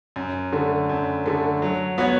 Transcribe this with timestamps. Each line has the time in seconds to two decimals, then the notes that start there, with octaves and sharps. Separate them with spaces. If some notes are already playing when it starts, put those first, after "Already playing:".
0.16 F#2
0.53 D3 A3
0.89 F#2
1.26 D3 A3
1.62 F#3
1.98 B3 F#4 C#5